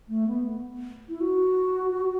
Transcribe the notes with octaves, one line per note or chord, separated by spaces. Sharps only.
A3
B3
E4
F#4